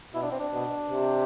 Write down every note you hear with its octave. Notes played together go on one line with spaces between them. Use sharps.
B2 E4
D4
C4
D4
B2
C3